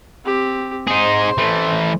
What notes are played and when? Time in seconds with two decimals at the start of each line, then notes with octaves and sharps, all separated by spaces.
0.24 C4 G4
0.88 D#4 G#4 C5 C6
1.38 E3 A3